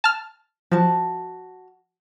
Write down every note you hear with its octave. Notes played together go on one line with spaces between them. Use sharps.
A5 F6
F3 F#4 A5